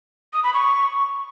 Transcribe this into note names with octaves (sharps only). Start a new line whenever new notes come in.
D#6
B5
C#6